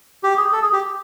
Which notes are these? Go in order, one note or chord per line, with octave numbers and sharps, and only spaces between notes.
G4
G#4
A4
G#4
G4